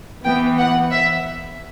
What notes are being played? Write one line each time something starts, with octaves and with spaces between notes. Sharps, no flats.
E3 B3 G5
F#5
E5